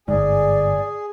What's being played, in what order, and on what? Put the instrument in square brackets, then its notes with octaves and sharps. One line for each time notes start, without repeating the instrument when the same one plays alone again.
[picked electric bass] G1 G#2 [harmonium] G#4 [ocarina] D5